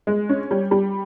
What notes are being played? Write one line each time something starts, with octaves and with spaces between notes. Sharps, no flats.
G#3
C#4
G3
G3